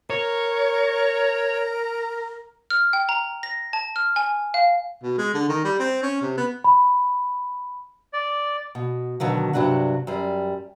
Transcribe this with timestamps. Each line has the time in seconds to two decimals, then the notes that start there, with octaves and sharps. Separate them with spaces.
0.10 A#4 C#5
2.70 F6
2.93 G5
3.09 A#5
3.43 A#6
3.73 A5
3.96 F6
4.16 G#5
4.54 F5
5.03 B2
5.18 G#3
5.34 D3
5.49 D#3
5.65 G3
5.79 C4
6.03 C#4
6.22 C3
6.37 B3
6.64 B5
8.13 D5
8.75 B2
9.20 B2 D3 D#3 F#3
9.53 G2 C3 F#3 D4 F#4
10.07 F#2 G3